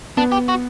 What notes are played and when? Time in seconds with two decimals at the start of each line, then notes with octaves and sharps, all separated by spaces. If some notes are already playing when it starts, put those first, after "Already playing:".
0.17 B3 D4
0.32 G4
0.48 F#4